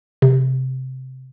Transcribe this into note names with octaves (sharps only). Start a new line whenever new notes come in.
C3